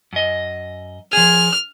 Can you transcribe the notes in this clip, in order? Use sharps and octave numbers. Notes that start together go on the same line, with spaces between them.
F#2 D#5
F3 G#4 F6